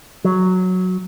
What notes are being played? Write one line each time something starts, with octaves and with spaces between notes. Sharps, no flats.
F#3